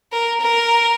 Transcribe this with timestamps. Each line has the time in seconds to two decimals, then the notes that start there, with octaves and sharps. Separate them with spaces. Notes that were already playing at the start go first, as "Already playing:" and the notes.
0.12 A#4
0.41 A#4